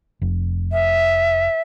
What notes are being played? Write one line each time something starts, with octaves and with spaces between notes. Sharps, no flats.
F1
E5